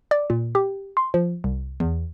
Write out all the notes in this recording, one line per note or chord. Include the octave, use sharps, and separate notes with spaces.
D5
A#2
G4
C6
F3
C2
E2